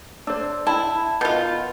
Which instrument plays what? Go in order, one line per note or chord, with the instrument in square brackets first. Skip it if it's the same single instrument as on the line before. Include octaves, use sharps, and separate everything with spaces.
[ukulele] D4 C5 [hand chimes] D5 E6
[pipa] E4 [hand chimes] G5 [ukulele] A5
[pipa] B2 F4 [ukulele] A#4 [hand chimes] G6